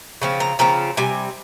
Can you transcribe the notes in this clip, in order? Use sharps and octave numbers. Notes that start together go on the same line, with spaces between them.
C#3 F3 C4
A#5
C#3 F3 C4 A#5
C3 G3 G#5